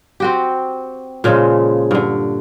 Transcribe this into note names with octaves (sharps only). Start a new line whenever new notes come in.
C4 F#4 G4
A#2 C#3 F3 G#3
G2 D3